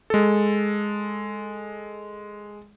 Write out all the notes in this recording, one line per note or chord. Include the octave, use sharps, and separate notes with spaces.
G#3 A4